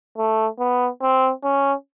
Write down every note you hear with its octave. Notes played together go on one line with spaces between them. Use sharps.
A3
B3
C4
C#4